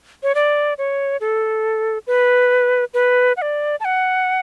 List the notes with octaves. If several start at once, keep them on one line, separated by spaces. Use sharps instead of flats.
C#5
D5
C#5
A4
B4
B4
F#5
D5
A5
F#5